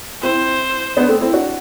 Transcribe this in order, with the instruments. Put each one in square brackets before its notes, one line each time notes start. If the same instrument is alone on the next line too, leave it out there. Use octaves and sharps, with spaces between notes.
[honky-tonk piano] C4 E4 [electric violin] C5
[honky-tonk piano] B3 D4
A3 C4
C4 E4
D4 F#4